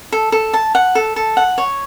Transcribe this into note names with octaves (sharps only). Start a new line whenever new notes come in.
A4
A4
A5
F#5
A4
A4
F#5
C#5